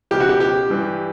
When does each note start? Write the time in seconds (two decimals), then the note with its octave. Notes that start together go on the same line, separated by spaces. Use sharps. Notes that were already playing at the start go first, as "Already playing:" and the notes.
0.11 C#2 B2 G4
0.20 F#4
0.29 G4
0.40 G4
0.70 G2 E3